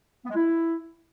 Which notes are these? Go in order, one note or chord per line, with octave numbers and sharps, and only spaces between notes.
B3
G#3
E4